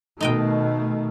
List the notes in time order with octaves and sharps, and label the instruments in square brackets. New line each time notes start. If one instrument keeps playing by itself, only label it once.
[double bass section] B2 D#3 A3 [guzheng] D#4 D#5 G5